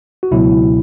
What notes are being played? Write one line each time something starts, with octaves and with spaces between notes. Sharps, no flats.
F#4
C#2 B2 F#3 E4